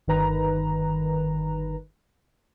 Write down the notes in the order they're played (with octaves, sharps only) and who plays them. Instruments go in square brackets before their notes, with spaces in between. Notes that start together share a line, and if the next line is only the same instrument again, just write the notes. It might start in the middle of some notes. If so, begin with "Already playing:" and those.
[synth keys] G1 D#3 B4 A#5